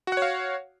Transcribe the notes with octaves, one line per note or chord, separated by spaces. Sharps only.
F#4 C#5 F5 F#5